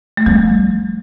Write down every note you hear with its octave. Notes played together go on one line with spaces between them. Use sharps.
A3
G3 B3
F3